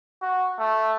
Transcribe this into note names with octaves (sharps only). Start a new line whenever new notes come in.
F#4
A3